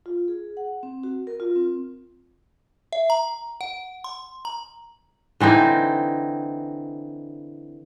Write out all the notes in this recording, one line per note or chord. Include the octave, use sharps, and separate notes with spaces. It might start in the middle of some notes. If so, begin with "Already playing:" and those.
F4
G#4
F#5
C4
F#4
A#4
F4
C4
E5
A#5
F#5
C6
A#5
D3 E3 C4 D#4